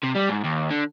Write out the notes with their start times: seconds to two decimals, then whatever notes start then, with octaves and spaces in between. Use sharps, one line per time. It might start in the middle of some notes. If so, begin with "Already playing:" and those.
0.03 C3
0.15 G3
0.29 G#2
0.44 D#2
0.71 D3